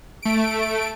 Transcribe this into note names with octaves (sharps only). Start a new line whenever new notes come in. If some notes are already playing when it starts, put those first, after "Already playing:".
A3 D7